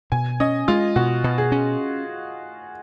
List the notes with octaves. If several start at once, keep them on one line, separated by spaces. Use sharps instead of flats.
B2 G#5
C#4 D#5
G#3 F4
B2 F#4
B2
G#4
C#4